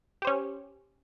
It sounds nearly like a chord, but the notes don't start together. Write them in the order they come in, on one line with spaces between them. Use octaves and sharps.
G4 C5 C#4